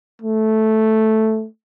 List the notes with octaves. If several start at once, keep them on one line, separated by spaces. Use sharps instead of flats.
A3